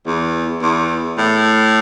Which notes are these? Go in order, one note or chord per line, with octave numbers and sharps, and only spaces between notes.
E2
E2
A2